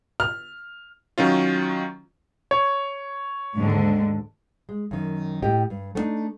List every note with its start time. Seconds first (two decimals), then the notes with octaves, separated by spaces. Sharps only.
0.20 F6
1.18 D#3 F#3 C#4 F4
2.51 C#5
3.56 D#2 G#2 D3
4.69 G#3
4.91 F#2 D#3
5.42 A2 G4 D#5 G5
5.70 G2
5.95 A3 B3 D4 D#4